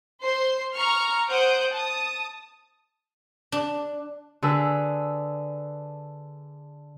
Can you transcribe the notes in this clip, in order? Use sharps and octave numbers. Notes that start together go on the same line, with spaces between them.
C5 C6
A#5 C#6 F6
C5 F#5 D#6 G6 D7
A5 D#6
D4
D3 G#4 B4 E6